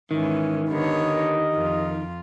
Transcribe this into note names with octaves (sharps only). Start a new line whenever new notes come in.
G#2 D#3 E3 C#4
D3 B3 G4 A#4 C#5 D#5
F2 F4